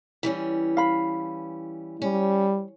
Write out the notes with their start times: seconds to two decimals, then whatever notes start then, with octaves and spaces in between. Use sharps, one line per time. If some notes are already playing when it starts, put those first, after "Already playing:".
0.23 E3 G3 C#4
0.77 F5 B5
2.02 G3 C#4